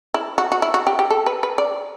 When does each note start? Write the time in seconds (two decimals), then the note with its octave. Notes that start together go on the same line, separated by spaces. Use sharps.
0.14 E4
0.38 F#4
0.52 F#4
0.62 E4
0.74 F#4
0.87 G4
0.99 G4
1.10 A4
1.26 B4
1.43 B4
1.58 D5